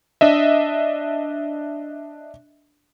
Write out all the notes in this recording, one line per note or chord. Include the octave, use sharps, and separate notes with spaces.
D4 D#5 E5